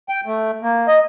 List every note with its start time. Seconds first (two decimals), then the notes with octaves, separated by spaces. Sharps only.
0.09 G5
0.26 A3
0.62 A#3
0.88 D#5